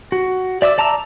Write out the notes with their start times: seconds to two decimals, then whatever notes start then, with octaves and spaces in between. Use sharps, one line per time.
0.12 F#4
0.62 D5 E5 D6 E6
0.78 D5 A5 A#5 D6 E6